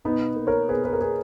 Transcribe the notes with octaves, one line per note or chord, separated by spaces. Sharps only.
B2 B3 D#4
A#3
A#4 C#5
B2 G#4 B4
G#4 B4
A#4
A#3 G#4 B4